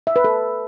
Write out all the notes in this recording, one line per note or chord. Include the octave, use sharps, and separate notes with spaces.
E5
B4
A4